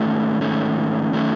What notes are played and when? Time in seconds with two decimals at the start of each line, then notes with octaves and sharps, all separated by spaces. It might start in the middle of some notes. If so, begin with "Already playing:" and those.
Already playing: G#2 D#3 A3 C#4
0.41 G#2 D#3 A3 C#4
1.13 D#3 A3 C#4